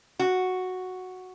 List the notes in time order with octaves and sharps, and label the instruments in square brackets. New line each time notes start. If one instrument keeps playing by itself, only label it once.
[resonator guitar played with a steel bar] F#4